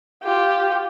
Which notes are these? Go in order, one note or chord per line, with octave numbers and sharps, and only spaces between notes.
F4 G4